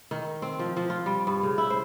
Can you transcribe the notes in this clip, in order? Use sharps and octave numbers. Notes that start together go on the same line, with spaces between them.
D#3
C4
F3
F3
F4
G3
G2
C#3
E4
C5